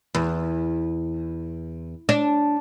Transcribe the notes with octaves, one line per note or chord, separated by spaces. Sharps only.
E2
D4